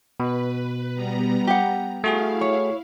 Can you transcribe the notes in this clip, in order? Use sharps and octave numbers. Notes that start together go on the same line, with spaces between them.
B2 B4
G3 B3 A#5
G4 F#5
A3 E4 F#4 G#4 F5
C#5